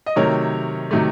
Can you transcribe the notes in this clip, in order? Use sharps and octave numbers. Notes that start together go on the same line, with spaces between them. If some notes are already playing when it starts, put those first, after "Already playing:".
D#5
C3 D#3 F#3 A3 A#4 C#5
C3 D#3 F#3 A3